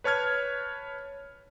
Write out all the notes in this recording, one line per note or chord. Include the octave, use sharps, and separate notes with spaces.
B4 C#5 A5 F6 G#6